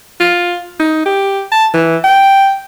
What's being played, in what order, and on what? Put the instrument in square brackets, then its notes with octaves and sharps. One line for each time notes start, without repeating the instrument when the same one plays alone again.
[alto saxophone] F4
D#4
G4
A5
E3
G5